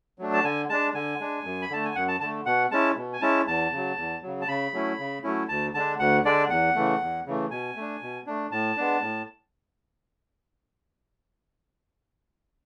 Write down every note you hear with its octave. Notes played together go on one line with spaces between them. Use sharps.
F#3 A3 D4
A5
D3 G#5
G#3 D4 A5
D3 G#5
G#3 D4
F#2
B5
D3 A3 A5
G#5
F#2 F#5
A5
D3 A3 A5
B2 F#5
G#3 C#4 E4 A5
B2
G#5
G#3 C#4 E4 A5
E2 A5
C#3 F#3
E2
C#3 F#3
A5
C#3 B5
F#3 A3 C#4 E4
C#3
F#3 A3 C#4 E4
D2 A5
D3 G#3 D4 A5
D2 F#5
D3 G#3 D4 D5
E2 F#5
C#3 E3 A3
E2
C#3 E3 A3
B2 G#5
A3 D4
B2
A3 D4
A2 A5
G#3 B3 D4
A2